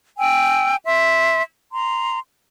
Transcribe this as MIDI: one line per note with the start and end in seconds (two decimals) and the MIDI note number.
0.18 0.75 79
0.18 0.75 80
0.18 0.75 88
0.85 1.41 76
0.85 1.41 84
1.71 2.18 82
1.71 2.18 84